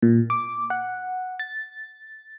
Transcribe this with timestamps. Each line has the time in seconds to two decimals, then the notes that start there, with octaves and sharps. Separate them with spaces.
0.02 A#2
0.30 D6
0.70 F#5
1.39 A6